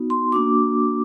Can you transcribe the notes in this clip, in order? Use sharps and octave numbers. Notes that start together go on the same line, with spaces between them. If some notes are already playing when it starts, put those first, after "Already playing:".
Already playing: B3 D#4 F#4
C6
A#3 D4 F#4 D6